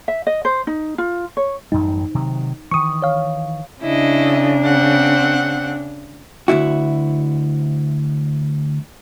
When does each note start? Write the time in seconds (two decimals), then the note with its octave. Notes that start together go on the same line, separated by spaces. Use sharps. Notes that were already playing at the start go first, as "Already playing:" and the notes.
0.08 E5
0.27 D#5
0.45 C5
0.67 D#4
0.98 F4
1.37 C#5
1.72 A1 F#2 G3 D#4
2.15 C3 D#3 F#3
2.71 D#3 E3 C#6 D#6
3.02 C#5 F5
3.82 C#3 D4 E4 D#5
4.65 C4 F#5
6.48 D2 G2 E4 F#4